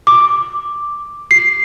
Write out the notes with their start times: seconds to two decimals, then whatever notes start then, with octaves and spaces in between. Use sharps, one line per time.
0.07 D6
1.31 C7